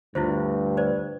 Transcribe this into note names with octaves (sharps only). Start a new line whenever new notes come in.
D2 G2 E4 F4 C5
B4 C5 D5